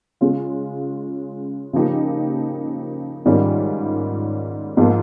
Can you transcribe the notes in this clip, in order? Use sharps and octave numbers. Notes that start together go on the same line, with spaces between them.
C#3 G#3 C#4 F4
C#3 F3 A#3 D#4 G4
G#2 D#3 G3 C#4 F4
G#2 F3 A#3 F4